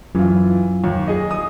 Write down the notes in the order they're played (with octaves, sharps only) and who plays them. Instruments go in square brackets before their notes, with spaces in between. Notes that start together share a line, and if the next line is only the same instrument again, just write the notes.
[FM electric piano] F#2 [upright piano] E3 F4
[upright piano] D#2
G#4 D#5
D#6